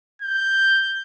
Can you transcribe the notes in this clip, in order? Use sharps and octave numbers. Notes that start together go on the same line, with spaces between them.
G6